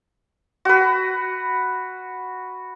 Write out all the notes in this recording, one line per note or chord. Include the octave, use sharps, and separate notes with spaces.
F#4 B4